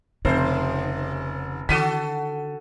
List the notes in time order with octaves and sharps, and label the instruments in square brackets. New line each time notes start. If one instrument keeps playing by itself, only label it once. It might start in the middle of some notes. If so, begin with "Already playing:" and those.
[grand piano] F1 [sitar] D#2 G#2 C5 [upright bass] C#3
[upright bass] D3 [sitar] D#3 F#4 A4 [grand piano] B6 D#7